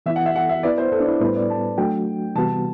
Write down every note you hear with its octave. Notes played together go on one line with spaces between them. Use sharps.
E3 B3 E4 E5
F#5
E5
F#5
E5
B3 E4 B4 D5 E5
C5
A4
D4
E4
A2 G3 B3 E4 B4 C5
D5
A5
F#3 A3 D4 F#4 G5
C3 E3 G3 B3 F#4 A5